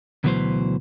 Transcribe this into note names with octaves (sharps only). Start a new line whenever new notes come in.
D2 B2 E3 F#3 B4 C5